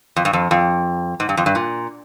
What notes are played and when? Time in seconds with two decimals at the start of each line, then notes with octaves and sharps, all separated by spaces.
0.16 F2
0.25 G2
0.33 F2
0.51 F2
1.20 G#2
1.29 G2
1.37 F2
1.46 G2
1.55 A#2